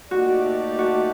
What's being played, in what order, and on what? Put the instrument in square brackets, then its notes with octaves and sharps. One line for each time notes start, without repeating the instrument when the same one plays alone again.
[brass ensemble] A#2 A3 D#4 G4 D5 [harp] F#4
[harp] F#4